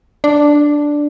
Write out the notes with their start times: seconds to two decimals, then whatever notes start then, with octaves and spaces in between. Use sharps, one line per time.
0.24 D4